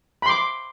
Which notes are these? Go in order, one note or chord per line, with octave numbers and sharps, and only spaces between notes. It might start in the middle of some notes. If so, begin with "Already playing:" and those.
B5 C6 D6